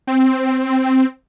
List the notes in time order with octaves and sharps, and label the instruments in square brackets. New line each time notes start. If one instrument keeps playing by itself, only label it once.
[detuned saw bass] C4